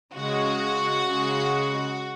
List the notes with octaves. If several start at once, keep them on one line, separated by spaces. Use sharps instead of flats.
C#3 G#3 F#4
C#3 G#3